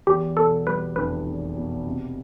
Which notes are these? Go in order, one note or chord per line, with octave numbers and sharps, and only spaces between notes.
E2 G4
B2 A4
G3 B4
F1 B4
E2
B2
C3